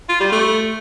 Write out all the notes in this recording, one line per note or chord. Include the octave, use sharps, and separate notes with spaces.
F4
G3
A3